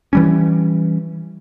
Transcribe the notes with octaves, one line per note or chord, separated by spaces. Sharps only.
E3 G3 C#4